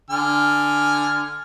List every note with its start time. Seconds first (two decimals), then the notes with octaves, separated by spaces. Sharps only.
0.10 D3 G#5 F6